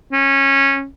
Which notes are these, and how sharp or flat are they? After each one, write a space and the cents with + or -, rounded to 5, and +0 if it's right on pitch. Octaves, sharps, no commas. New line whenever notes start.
C#4 -15